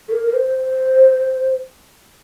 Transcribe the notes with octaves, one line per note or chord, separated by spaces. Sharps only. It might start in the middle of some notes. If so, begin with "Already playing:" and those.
A4
A#4
A#4
C5